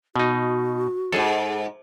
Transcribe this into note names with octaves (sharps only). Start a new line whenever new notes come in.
B2 D#4 F#4
F2 G#2 G#4 A4